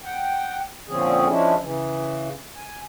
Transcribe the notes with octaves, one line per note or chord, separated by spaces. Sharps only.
F#5 G5
A#2 D3 F3 C4 C#4 G#4
F3 G#3 C#4 D4 E4
C#3 E3
G#5